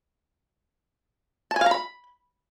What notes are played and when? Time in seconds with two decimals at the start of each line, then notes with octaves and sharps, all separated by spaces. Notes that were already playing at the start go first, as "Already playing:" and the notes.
1.51 A5
1.56 G#5
1.61 F5
1.66 A#5
1.71 B5